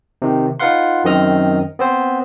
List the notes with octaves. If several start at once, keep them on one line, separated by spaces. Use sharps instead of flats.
C3 D#3
D#4 F4 B4 F5 F#5 C6
F#2 D#3 C4 D#5 D#6 F6
B3 C4 C5